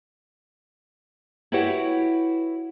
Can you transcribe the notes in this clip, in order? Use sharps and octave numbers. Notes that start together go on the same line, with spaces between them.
E4 F#4 G4 B4 C#5 F#5